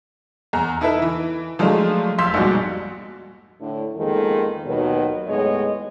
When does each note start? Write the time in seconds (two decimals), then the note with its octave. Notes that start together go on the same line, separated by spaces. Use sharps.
0.53 E2 A#5
0.81 D#4 E4 A4 B4 E5
1.02 E3
1.59 F3 F#3 G#3 A3 D4 F4
2.18 F1 F5 C6 E6 G6 B6
2.34 A#1 G#2 B2 G3 F#4
3.61 A2 D3
3.96 F2 D#3 G#3 A#3 B3 A4
4.66 D#2 B2 D#3 F#3 B4 C#5
5.27 D#2 A2 G#3 B3 C#5 D#5